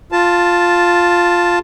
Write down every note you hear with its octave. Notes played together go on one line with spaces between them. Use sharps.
F4 A5